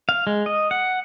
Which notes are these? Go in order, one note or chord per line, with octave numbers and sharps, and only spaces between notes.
F5
G#3
D#5
F#5